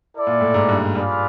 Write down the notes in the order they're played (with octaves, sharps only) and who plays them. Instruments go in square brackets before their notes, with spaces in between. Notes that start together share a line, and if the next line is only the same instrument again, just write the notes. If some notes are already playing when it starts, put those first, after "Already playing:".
[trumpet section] E4 A4 D5
[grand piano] A#2
A2
G#2
G2
[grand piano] G2 [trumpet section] F4 G#4 B4 D5 F5